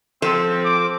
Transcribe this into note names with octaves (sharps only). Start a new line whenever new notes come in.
F3 C4 A4
D6